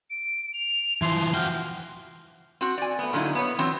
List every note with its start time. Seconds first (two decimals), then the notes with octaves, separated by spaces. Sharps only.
0.10 D7
0.53 F7
1.02 E3 F3 C6
1.34 F#4 G5 F6
2.61 C4 F#4
2.78 D5 G#5
2.99 A3 B3
3.13 A#2 D3 F#3 D#4 E4
3.35 B3 C#5
3.59 E3 F#3 C4